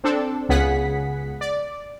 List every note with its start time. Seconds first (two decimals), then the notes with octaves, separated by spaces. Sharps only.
0.04 C4 D4 A4
0.49 C#2 C#3 B3 G#4 F#5 B6
1.41 D5